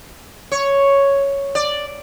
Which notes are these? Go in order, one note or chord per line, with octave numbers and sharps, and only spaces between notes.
C#5
D5